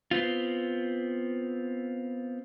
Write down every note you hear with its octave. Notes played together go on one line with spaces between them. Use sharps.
B3 C4 F4